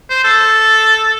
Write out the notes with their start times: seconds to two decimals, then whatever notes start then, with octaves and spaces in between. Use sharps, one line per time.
0.10 C5
0.24 A4